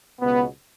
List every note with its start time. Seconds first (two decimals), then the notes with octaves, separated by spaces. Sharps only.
0.20 C#2 B2 B3